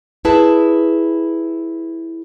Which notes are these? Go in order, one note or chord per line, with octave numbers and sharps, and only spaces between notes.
E4 G#4 B4 A5